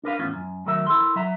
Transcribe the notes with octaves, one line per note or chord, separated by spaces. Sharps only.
D4 A#4 B4 F5
E2 A2 C#4 F4
F#2
D#3 F#3 A3 A#4 E5
E4 A4 A#4 C6
F#3 E5 A#5